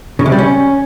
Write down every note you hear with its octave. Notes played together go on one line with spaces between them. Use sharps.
C#3
C3
G3
C#4